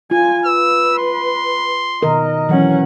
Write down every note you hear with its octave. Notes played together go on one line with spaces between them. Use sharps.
F4 G#5
B4 E6
C6
B2 D#3 A#4 D#5
E3 F#3 C#4 F#5